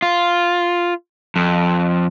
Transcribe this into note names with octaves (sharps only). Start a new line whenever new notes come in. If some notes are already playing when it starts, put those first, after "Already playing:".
F4
F2